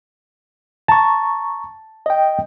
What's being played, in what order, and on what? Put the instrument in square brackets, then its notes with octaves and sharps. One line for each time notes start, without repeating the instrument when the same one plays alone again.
[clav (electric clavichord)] A5 [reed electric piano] A#5 C#6
[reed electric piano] D#5 G5